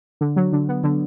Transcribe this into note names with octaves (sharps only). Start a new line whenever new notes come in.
D3
F#3
D3
B3
D3